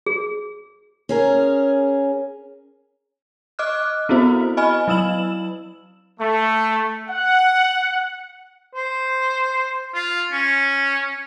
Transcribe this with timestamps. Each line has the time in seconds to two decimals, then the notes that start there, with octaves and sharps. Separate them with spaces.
0.06 G#4
1.09 C#4 G#4 A#4
3.59 D#5 D6 F6 F#6
4.09 B3 C4 E4 F#4 C5
4.57 D#5 G#5 B5 F6
4.88 F#3 E4 E6 E7 F#7
6.19 A3
7.09 F#5
8.75 C5
9.94 F4
10.32 C#4